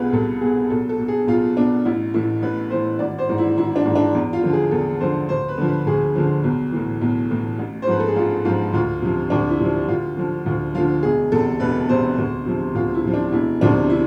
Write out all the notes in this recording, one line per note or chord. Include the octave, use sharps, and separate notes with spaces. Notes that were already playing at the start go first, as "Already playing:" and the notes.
Already playing: C2 B2 F4 G#4 B4
C2 A4
B2 G#4
B1 A4
A4
B2
G#4
B1 F4
B2 D4
A1 E4
A2 E3 E4
A1 B4
A2 E3 C5
G#1 D5
C5
G#2 E3
E4
G#1 E4
D4
G#2 E3
D4
E2
F4
D3 F3
G#4
E2 A4
D3 F3 C5
D2 C5
B4
D3 F3
B4
D2 G#4
D3 F3
B1
A2 E3
B1
A2 E3
A1
C5
G#2 F3 B4
A4
G#4
A1 F4
G#2 F3 F4
D2 F4
C3 F3
D2 D4
E4
C3 F3
D2 F4
D3 F3
D2 F4
D3 F3 F4
E1 G#4
E2 C3 A4
E1 B4
E2 C3 C5
D2
C3 F3
D2 F4
E4
C3 F3
D4
E1 E4
D2 C3 F3 D4
E4